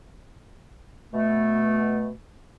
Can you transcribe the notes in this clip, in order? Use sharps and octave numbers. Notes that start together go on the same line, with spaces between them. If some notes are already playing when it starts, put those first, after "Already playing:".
B2 A3